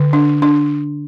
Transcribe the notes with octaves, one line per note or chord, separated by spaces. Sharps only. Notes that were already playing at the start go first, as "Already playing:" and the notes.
Already playing: D3
D4
D4